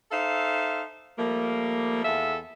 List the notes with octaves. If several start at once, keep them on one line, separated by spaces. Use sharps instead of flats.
D#4 A4 C5 E5 F5
F3 G3 A3 A#3
E2 F4 A4 E5